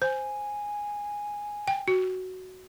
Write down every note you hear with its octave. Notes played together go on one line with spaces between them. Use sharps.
C5 G#5
G5
F#4